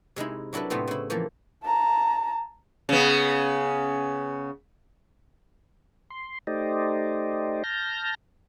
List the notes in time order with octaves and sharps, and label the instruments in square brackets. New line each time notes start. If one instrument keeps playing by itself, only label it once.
[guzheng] C3 G#3 D#4 E4
F#3 D4 E4 A4 B4
A2 C3 A3 B3 C4 F4
C#3 E4
E3 F3 A#3 G4 A4
[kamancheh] A5 A#5
[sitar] C#3 B3
[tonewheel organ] C6
A3 D#4 G4 C5 D5 D#5
A5 F6 G6 A#6